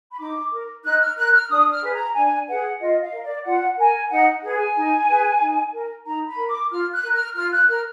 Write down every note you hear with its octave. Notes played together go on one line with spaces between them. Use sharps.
B5
D#4 D6
A#4
D#4 F#6
F6
A#4 F#6
F6
D4 D#6
F6
G#4 B4
A#5
D4 G#5
G#4 B4 F#5
F4 D#5
F5
A#4
D5
F4 F#5
A#4 G#5
D#4 F#5
G#4 B4
G#5
D#4
G#4 B4
D#4
A#4
D#4 A#5
B5
A#4
D6
F4 F6
F#6
A#4
F6
F4 F6
F#6
A#4 F6